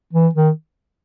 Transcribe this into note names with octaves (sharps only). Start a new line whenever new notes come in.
E3
D#3